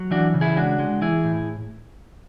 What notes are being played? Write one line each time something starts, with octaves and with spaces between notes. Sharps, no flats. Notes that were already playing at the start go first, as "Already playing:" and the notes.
Already playing: F#3
E3 D4 F#4
C#3
E4 G#4
G#3 D4 F#4
G#3
E3 E4 G#4
A2